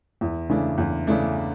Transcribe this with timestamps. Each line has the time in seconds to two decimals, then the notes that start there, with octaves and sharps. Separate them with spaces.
0.21 E2
0.49 C#3 E3 A3 D4
0.78 E2
1.07 C#3 E3 A3 D4